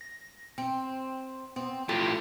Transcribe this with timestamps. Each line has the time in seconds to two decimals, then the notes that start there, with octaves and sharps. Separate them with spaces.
0.01 A#6
0.58 C4 G5
1.56 B3 C4
1.89 A2 F4 G4 A4